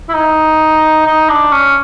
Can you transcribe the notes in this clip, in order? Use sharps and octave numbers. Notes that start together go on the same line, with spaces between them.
E4
D#4
D#4
D4
C#4